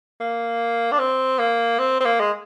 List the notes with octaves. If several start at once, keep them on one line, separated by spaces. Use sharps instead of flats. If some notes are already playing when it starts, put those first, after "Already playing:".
A#3
D4
C4
A#3
C4
C4
A#3
G#3